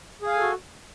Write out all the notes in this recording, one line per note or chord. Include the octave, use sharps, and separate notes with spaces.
F#4 G#4 A4 F5 G#5